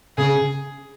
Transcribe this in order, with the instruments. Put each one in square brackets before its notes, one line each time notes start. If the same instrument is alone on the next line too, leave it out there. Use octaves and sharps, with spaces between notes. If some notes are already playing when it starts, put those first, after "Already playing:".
[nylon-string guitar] C#3 [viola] G#4